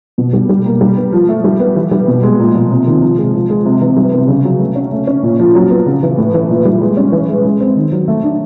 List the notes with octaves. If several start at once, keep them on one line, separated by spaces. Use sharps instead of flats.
B2
G3
G3
A#3
G3
B3
F3
A3
G3
B3
E3
G3
B2
G#3
A#2
F3
C3
D#3
F3
G#3
F3
G#3
C3
E3
G3
B3
C#3
F#3
A3
C#4
A3
C#4
A#2
F3
F#3
B3
C#3
E3
A2
E3
A#2
G3
G#3
C#4
E3
G#3
G#3
C4
D#3
F#3
A3
D4